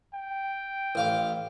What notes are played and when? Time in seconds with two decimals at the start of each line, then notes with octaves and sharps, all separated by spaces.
0.14 G5
0.95 A1 F5 D6